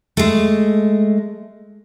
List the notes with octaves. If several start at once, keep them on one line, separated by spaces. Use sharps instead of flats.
G#3 A3